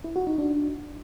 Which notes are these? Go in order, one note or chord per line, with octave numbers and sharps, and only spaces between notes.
E4
F#4
D#4
D4